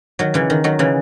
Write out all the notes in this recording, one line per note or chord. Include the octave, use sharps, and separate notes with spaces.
D#3 F#3
C#3 E3
D#3
D#3 F#3
C#3 E3